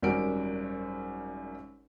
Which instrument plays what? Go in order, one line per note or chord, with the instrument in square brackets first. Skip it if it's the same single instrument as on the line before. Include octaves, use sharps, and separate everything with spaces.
[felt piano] G#1 F#2 G3 F#4 A#4 D7